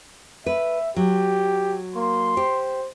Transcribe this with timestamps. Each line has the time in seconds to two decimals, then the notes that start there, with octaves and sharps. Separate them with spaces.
0.46 B4 E5
0.96 F#3 G4
1.96 A#3 C6
2.37 G4 C5